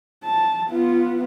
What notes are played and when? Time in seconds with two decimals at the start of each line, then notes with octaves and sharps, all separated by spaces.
0.24 A5
0.70 B3 F4